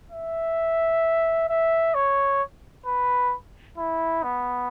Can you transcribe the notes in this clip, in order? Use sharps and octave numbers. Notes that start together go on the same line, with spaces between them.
E5
E5
C#5
B4
E4
B3